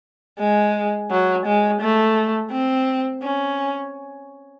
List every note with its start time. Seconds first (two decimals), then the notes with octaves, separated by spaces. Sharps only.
0.39 G#3
1.11 F#3
1.46 G#3
1.81 A3
2.51 C4
3.23 C#4